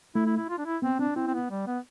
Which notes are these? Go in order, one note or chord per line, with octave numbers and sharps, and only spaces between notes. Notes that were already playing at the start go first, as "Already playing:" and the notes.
A3 E4
E4
E4
F4
D4
E4
B3 C4
C4 D4
C4 E4
C4
B3
G3
B3